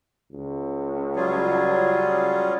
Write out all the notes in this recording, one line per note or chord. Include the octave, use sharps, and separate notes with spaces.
C#2
F#3 G3 C#4 F4 G#4